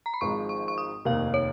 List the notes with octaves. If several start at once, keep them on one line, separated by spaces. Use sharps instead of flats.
A#5
B5
G#1 G#2 F3 G#3 C#6
C#6
C#6
D#6
F1 D#2 D#3 A#3 F5
C#5